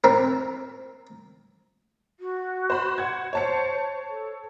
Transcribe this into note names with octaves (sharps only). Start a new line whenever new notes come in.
C4 A#4
F#4
C5 B5
F#5 G#6
C5 C#5 A5 C#7
A4